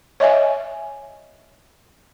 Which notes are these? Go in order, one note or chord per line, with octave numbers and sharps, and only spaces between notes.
C#5 D#5 E5 G#5